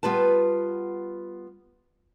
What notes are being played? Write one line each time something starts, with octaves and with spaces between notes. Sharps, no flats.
G3 B3 F4 B4 A5